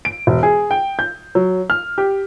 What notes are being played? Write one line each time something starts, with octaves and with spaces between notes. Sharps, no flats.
D7
E1
G#4
G5
G6
F#3
F6
G4